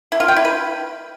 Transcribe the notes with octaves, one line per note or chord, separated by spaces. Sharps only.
E4
F4
G5
E4
B4